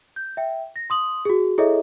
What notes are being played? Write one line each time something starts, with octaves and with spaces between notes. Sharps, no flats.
G6
E5 G5
A#6
C6 D#6 F#7
F#4 G#4
E4 G#4 A4 C#5 D#5 E5